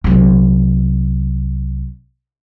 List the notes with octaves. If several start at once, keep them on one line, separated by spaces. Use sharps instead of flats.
C2 F#3